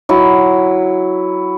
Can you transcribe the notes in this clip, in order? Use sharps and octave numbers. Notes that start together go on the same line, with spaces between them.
F#3 E4